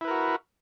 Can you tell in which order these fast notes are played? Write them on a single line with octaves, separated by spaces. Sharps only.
E4 B4 A#4 F#4